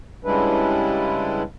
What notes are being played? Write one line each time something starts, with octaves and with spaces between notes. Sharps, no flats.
C#3 G3 G#3 D4 E4 B4